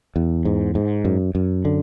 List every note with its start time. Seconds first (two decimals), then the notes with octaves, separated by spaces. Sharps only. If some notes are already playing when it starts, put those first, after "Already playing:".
0.16 E2
0.45 G#2
0.75 G#2
1.05 F#2
1.35 F#2
1.65 D3